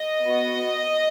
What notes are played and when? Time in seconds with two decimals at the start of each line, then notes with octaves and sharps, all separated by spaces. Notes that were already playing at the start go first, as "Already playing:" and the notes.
Already playing: D#5
0.22 B3 F#4